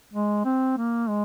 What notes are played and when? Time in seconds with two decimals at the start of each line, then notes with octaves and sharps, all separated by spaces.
0.13 G#3
0.45 C4
0.77 A#3
1.09 G#3